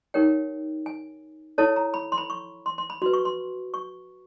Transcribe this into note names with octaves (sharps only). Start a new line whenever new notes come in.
D#4 G4 A#4 C#5 G5
G#5
E4 A4 C#5 A5
A#5
B5
C6
B5
C#6
C6
C6
B5
F#4 B4 C6
C#6
C6
C#6